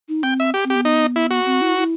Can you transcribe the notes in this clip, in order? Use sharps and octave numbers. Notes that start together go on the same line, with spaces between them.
D#4
C4 G5
E5
G4
C4
G4
B3
D#4
E4
F#4
C4
E4
E4